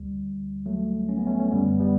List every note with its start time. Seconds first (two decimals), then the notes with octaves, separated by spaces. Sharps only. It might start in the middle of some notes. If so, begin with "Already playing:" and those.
Already playing: D2 D3 G3
0.66 F#3 A3
1.09 C#4
1.18 B3
1.27 A3 C#4
1.39 C#4
1.51 F#2 D3 G3 B3
1.80 G3 B3